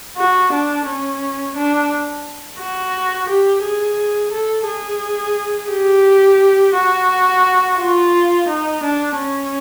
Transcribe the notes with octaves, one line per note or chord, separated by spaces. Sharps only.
F#4
D4
C#4
D4
F#4
G4
G#4
A4
G#4
G4
F#4
F4
D#4
D4
C#4